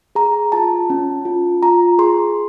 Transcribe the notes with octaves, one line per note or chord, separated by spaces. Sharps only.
G#4 A#5
F4 A5
C#4
F4
F4 A#5
G#4 C6